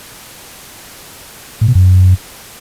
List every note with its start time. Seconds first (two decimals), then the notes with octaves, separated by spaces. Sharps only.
1.61 A2
1.68 B2
1.75 F#2